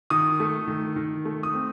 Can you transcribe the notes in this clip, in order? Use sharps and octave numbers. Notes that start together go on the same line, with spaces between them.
D#3 D#6
A3
D#3
D#3
A3
D#6
C4